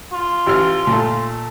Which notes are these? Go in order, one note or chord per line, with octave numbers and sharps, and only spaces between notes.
F4
A1 F6
A#2 A3